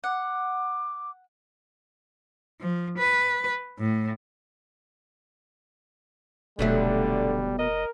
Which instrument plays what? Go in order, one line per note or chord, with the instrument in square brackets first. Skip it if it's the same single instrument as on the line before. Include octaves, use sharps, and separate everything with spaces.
[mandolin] F#5 [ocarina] D6
[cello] F3
B4
A2
[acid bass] F1 [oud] B2 F#3 A3 [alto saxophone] D3 [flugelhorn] G3
[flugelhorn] A#4 [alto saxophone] D#5